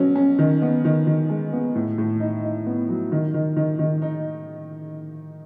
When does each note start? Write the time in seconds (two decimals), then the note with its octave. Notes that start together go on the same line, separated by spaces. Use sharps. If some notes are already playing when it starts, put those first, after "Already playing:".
Already playing: B2 F#3 C#4
0.16 C#4
0.39 D#3
0.62 B3
0.85 D#3
1.07 D#3
1.29 G#3
1.53 B3
1.75 A2
1.98 A2
2.20 D#4
2.44 D#4
2.66 B3
2.89 F#3
3.12 D#3
3.34 D#3
3.56 D#3
3.79 D#3
4.02 D#4